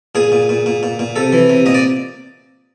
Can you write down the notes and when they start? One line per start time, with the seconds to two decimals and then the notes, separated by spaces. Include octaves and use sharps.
0.15 A#2 G#4
0.32 A#2
0.49 A#2
0.66 A#2
0.83 A#2
0.99 A#2
1.16 C3 A4
1.32 E3
1.50 C3
1.66 A#2 D#5
1.74 D5